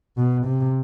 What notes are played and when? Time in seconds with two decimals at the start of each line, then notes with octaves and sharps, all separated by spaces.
0.17 B2
0.46 C3